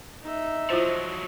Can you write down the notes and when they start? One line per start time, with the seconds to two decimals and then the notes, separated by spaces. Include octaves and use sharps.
0.22 D#4 E5
0.70 F3 F#3 E4 F4 C5